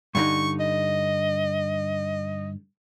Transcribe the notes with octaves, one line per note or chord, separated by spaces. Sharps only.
G2 D3 D#4 C#6
D#5